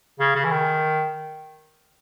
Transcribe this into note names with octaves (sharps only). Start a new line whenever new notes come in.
C#3
C#3
E3
D#3